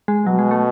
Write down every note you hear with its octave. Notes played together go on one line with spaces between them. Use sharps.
G#3
B2 F#3
G#3
A3